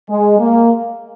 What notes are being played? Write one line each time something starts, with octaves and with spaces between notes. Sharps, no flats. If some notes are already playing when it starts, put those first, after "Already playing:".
G#3
A#3